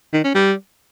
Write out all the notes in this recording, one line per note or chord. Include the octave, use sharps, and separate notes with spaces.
D#3
C#4
G3